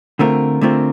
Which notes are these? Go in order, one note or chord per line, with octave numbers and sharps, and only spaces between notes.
D3 A3 C4 F4 A#4
D3 A3 C4 F4 A#4